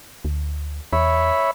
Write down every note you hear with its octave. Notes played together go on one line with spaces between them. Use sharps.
D2
E2 C#5 E5 B5